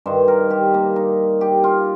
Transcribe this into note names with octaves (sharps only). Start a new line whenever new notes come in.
G2 D#3 C5
A#4
G4
A#3
D#4
G4
F4